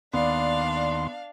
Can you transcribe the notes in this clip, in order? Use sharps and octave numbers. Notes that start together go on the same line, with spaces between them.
D#2 B3 D4 D5 F5 C6